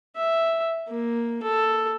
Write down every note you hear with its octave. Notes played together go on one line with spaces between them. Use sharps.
E5
A#3
A4